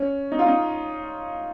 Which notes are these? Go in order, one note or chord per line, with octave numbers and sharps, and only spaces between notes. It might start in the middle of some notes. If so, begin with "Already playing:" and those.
Already playing: C#4
D#4
F4
D#4